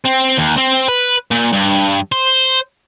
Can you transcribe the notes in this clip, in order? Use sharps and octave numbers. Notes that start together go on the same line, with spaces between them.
C4
D#2
C4
B4
A#2
G2
C5